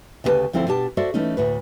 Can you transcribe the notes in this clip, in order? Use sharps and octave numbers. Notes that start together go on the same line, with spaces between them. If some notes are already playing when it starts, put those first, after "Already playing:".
D2 C#3 D#4 G4 B4 A5
D2 F3 C4 E4 A4 C5
B2 D4 G4 A5
F#4 A4 C5 D5 E5
E3 A3 C#4 D#4
D2 A2 B4